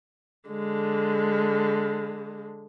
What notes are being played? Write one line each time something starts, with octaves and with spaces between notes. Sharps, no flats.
D3 G#3